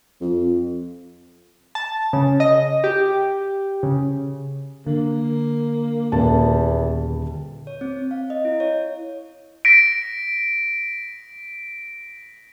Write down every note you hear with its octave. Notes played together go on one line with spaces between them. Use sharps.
F2
A5
C#3
D#5
G4
C#3
D3 A#3
D#1 E2 A5
C#5
C4
F5
D#5
E4
C#5
A#6 B6 D7